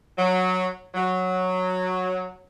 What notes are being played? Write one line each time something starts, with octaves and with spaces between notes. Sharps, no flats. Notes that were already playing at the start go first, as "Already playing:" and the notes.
F#3
F#3